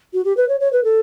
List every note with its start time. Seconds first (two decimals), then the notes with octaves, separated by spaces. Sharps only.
0.13 F#4
0.25 G4
0.37 B4
0.49 C#5
0.60 C#5
0.73 B4
0.84 A4